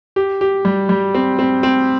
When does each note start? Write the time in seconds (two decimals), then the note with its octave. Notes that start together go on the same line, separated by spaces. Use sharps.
0.16 G4
0.41 G4
0.65 G3
0.89 G3
1.15 C4
1.39 C4
1.63 C4